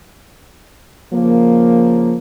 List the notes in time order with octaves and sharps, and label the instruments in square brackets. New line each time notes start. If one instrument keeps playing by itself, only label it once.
[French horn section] C#3 F3 A#3